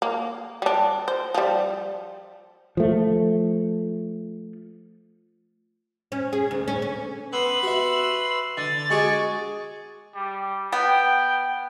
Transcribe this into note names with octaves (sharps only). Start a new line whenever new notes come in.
A#3
G3 D4
C5
F3 G3
F3 A3
C#4
G#4
D2
C#4
C#4
B3 B4 C6 E6 F#7
F#4 E5
D3 A6
G#3 F#4 G#4 G#5 C#6 D6
G3
B3 G5